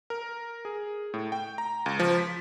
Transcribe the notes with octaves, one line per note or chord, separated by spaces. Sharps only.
A#4
G#4
A2
G5
A#5
C#2
F3
B6